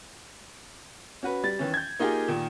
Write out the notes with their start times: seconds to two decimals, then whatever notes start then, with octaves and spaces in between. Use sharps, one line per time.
1.23 C#4 F#4 B4
1.44 G3 A6
1.59 D#3 E3 C#4
1.74 G6 G#6
1.99 A#3 D#4 F4 G4 G#4
2.28 A#2 D#3